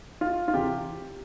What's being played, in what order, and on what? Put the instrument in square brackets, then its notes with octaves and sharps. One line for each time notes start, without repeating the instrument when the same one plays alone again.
[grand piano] F4
F4
C3 E3 G4